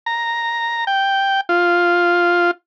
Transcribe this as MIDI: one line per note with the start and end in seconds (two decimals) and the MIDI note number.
0.06 0.85 82
0.87 1.41 79
1.49 2.51 65